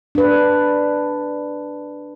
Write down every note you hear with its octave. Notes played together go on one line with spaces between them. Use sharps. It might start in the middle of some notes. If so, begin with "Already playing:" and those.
D4 B4